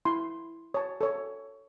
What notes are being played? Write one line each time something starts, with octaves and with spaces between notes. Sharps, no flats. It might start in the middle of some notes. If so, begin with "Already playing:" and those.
E4 C6
C#5 A5
A4 C#5